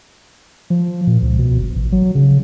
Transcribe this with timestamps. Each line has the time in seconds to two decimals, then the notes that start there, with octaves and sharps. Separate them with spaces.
0.70 F3
1.07 A#2
1.22 C#2
1.39 B2
1.59 G1
1.75 A1
1.92 F#3
2.15 C#3